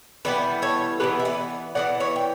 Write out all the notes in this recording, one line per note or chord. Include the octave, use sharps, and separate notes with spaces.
E3 G3 B3 B4 D5
A4 C#5
E3 G3 B3 G4 B4
E5
B4 D5
E3 G3 B3 D5 F#5
C#5 E5
G5